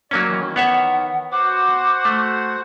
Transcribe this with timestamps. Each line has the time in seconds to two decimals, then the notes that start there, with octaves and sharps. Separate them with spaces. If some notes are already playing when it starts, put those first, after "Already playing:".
0.11 F#3 A#3 C#4 D5
0.27 D#3 E3
0.56 B3 C#5 E5 F#5
1.32 F#4 C5 F#5 D6
2.05 A3